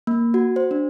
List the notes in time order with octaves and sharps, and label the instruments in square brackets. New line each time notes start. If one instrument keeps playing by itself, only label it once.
[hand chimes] A#3
F#4
C5
D4